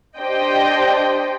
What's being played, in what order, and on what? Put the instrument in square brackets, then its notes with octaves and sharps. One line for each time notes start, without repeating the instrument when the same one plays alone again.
[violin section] D4 G4 C5 D#5 G5